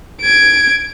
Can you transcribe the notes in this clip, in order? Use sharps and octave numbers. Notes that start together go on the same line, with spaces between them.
G#6 D7